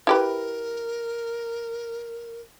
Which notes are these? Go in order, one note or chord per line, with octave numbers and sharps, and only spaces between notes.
E4 G4 A#4 B4